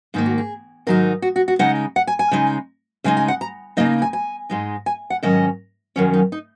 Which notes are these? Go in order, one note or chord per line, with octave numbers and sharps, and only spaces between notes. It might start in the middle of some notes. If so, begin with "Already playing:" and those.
G#2 D#3 A#3 D#4
F#4
G#4
G#2 D#3 F#3 D#4 A#4
F#4
F#4
F#4
C#3 G#3 D#4 F#5
F#5
G#5
G#5
C#3 G#3 D#4
C#3 G#3 D#4 G#5
G#5
F#5
A#5
C#3 A#3 D#4 D#5
G#5
G#5
G#2 G#3 D#4
G#5
F#5
G#2 D#3 F#3 C#4 D#5
F#2 D#3 F#3 C#4 C#5
D#4
D#4